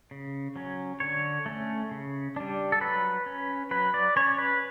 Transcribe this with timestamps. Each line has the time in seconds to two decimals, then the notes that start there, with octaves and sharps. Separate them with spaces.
0.11 C#3
0.56 F#3 C#4
1.00 D3 C#5
1.46 A3 C#4
1.91 C#3
2.36 G3 D4
2.72 A4
2.81 F#3 B4
3.26 C#4
3.71 F#3 B4
3.94 D5
4.16 C#4 C#5
4.38 B4